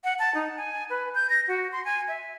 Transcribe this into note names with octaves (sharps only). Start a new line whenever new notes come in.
F#5
A5
D#4
G#5
B4
G6
A#6
F#4
C6
G#5
E5